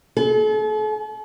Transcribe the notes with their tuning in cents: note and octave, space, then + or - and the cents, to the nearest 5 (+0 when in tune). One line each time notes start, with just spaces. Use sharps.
A4 -45